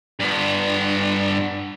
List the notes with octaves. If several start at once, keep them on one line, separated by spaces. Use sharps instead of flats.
G2 B3